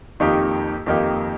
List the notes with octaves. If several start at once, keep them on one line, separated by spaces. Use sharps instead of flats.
F2 D#3 A#3 D#4 G4
F2 D#3 A#3 D#4 G4